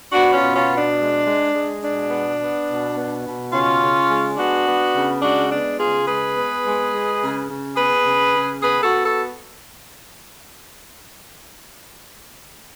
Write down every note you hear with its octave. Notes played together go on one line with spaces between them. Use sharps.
B3 D4 F#4
C#4 F4
B2
C#4 F4
B2
D4
G#3
G#3
G#3
B2 D4
B3
B3
B2
B3
B2
C#3 C#4 F4
C#3
G#3
B3 D4 F#4
B3
C#3
G#3 D4 F#4
B3 D4
C#3 F4 G#4
G#3 G#4 B4
B3
G#3
G#3
C#3
C#3
B3 G#4 B4
C#3
C#3
B3 G#4 B4
F#4 A4
B3
F#4 A4